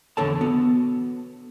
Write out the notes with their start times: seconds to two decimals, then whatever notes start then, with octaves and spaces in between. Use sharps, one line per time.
0.17 E2 D3 A4 C#5 A5
0.41 B3 F#4